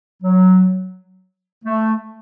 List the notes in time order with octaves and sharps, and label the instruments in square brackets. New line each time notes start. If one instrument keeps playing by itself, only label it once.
[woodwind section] F#3
A3